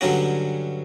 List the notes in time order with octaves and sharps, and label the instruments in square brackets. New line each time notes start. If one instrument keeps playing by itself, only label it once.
[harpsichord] G2 D3 F#3 C#4 F#4